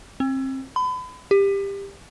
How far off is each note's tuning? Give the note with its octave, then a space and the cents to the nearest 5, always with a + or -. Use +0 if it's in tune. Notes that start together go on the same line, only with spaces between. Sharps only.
C4 +30
B5 +35
G4 +15